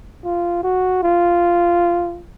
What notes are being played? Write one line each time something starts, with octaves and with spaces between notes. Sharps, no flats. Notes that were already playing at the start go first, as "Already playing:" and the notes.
F4
F#4
F4